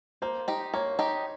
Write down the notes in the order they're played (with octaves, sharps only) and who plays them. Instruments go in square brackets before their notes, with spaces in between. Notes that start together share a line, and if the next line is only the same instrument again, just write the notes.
[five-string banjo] A#3 [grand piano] C5
[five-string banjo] D#4 G4
[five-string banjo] A#3 [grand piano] C#5
[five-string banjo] D#4 G4